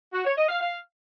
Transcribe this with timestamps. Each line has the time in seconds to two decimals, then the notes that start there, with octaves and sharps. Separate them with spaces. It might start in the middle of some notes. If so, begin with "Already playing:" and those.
0.13 F#4
0.25 C#5
0.37 D#5
0.49 F5
0.61 F5